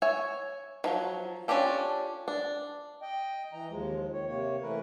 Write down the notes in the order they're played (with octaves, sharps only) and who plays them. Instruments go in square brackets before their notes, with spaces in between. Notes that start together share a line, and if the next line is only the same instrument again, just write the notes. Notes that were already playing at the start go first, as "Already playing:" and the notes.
[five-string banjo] C#5 E5 G#5
D#3 F3 F#3
C#4 D4 F4 G4 A4
D4
[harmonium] D#5 G5
E3 D#5 A#5
D#2 F3 G#3
D#3 C#5
C3 A#3 C#5
E3 A3 A#4 B4